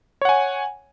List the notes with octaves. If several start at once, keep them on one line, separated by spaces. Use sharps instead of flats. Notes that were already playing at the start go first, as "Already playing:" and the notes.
C#5 F#5 G#5